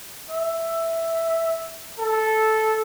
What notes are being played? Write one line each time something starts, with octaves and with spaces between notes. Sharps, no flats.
E5
A4